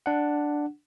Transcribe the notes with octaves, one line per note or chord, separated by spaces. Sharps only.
D4 F#5